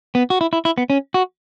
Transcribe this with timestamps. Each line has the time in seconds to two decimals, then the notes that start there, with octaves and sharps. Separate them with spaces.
0.15 B3
0.30 F#4
0.41 E4
0.53 E4
0.65 E4
0.78 B3
0.90 C#4
1.14 F#4